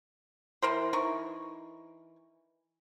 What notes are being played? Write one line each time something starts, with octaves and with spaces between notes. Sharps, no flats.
E3 A#4 C5
E3 D#4 A#4 C#6